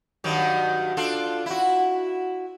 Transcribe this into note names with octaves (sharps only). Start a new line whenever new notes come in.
G2 D#3 F#3
D4 F4 A4
E4 F#4